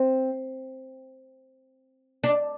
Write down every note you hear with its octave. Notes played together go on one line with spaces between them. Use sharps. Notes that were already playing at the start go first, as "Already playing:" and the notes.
Already playing: C4
D4